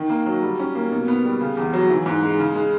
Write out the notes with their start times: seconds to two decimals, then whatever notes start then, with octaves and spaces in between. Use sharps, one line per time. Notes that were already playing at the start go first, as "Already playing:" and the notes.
Already playing: D#3
0.10 A#3
0.26 F#3
0.42 G3
0.60 C#4
0.75 A#3
0.92 B2
1.08 B3
1.25 G3
1.41 C#3
1.57 E2
1.73 F#3
1.90 E3
2.06 G#2
2.23 G#3
2.39 C#3
2.55 G#3